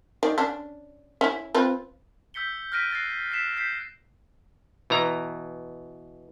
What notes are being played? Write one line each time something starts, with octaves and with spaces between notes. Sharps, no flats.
D#3 D5
C#4 D4
C#4 E4
C4 F4 B4
E6 G6 B6 C#7 G7
F6 F#6 A#6 B6 D7 D#7
F#6 A6 A#6 C7
E6 B6 C7 E7
G6 B6 C7
B2 E3 A#5